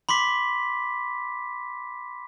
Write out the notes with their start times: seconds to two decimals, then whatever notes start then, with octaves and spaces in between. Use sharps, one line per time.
0.09 B5 C6 D6 B6